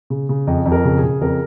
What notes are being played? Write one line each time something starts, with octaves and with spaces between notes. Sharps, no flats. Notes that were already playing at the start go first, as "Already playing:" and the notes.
C#3
C#3
F2 D#5
F2
A#4
C#3
G#4
C#3
F2 A#4